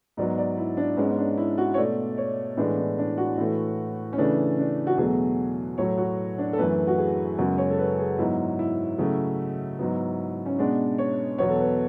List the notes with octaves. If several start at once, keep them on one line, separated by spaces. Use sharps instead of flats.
G#2 F#3 B3 D5
D5
E4
D4
G#2 G#3 B3 C#4
C#4
D4
E4
F#4
C#5
B2 A3 D5
C#5
A2 E3 G#3 B3 D4
D4
D4
F#4
A2 E3 A3
C#4
C#3 E3 A3 D4
D4
F#4
E2 B2 F#3 A3 G#4
A2 F#3 A3 C#5
F#4
D4
A4
F#2 E3 A3 B4
F#4
G#4
F#2 C#3 G#3 B3 F#4
C#5
A4
B4
G#4
G#2 F#3 B3 E4
E4
C#3 F#3 A3
G#2 F#3 B3
C#4
B2 G#3 B3 D4
C#5
E2 B2 F#3 B3 C#5
A4
B4